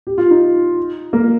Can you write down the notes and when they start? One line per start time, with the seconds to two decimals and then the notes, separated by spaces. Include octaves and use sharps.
0.07 G4
0.18 F4
0.31 D#4
1.13 A#3